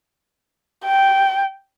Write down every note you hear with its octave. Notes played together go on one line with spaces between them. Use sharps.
G5